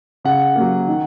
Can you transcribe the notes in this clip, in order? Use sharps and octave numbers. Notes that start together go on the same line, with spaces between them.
C#3 F#5
F#3 A#3
D#3